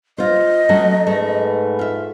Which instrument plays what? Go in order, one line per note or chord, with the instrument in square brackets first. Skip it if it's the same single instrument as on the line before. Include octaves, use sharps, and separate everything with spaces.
[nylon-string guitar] F4 C5 [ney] D#5
[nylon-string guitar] F#3 A3 C#4
[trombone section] G#2 B4 [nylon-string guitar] A3
[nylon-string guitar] F4 E5